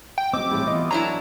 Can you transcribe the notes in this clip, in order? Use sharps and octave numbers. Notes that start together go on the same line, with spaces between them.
G5
F#3 C4 G4 D#5 D6
A2 E3 G3
E3 B3 F4 D#5
F#3 D4 E4 A4 G#5 A#5